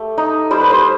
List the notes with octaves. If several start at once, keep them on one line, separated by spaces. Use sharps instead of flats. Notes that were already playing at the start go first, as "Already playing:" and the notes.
Already playing: A3 G4
D#4
G3 C5
B4
C5